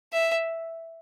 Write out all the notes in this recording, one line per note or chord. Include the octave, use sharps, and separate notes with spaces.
E5